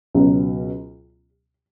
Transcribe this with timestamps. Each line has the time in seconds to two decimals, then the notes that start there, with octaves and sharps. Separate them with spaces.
0.14 C#2 B2 F#3